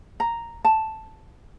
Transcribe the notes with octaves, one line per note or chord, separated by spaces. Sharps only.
A#5
A5